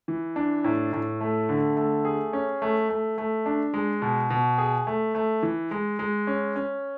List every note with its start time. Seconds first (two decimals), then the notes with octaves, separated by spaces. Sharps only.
0.08 E3
0.36 D4
0.64 A2
0.93 A2
1.21 A3
1.49 D3
1.77 A3
2.05 G#4
2.33 C#4
2.62 A3
2.89 A3
3.18 A3
3.46 D4
3.74 G#3
4.02 B2
4.30 B2
4.58 G#4
4.87 A3
5.15 A3
5.43 E3
5.71 G#3
5.99 G#3
6.27 C#4
6.56 C#4